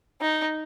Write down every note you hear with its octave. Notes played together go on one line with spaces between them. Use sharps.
D#4